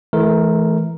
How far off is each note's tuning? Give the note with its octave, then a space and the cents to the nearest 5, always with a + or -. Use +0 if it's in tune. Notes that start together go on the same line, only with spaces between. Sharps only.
E3 +0 A3 -30 A#4 +0